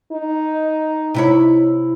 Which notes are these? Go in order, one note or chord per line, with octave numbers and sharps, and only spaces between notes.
D#4
C3 E4 C#5